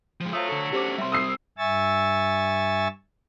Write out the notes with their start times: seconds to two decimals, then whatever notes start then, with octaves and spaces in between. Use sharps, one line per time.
0.21 F3 G#3
0.33 F#3 A3 F4 C5 F5 D#6
0.49 D3 A4
0.73 C#4 D4 G4 C5 D6
0.98 G3 C4 E5 C6
1.12 D#6 E6 C7
1.58 G2 E5 G#5 C#6 E6 A6